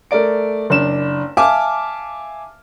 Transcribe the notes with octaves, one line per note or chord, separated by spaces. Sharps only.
A3 A#4 D5 D7
F#1 D4 E7
E5 F5 G#5 A5 D6 F6